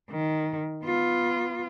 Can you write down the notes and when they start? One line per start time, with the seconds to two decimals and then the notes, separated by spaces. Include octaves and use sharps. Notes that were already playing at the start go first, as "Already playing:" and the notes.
0.11 D#3
0.84 B3 F4